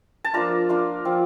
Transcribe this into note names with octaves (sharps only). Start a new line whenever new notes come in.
A5
F3 A#3 D4 F4 A#5
A#3 D4 F4
F3 C4 F4